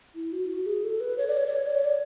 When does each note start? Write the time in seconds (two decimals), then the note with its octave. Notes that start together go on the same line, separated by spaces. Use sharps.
0.15 E4
0.33 F#4
0.49 F#4
0.66 G#4
0.84 A4
1.00 B4
1.18 C#5
1.28 D5
1.37 C#5
1.47 D5
1.56 C#5
1.66 D5
1.75 C#5
1.84 D5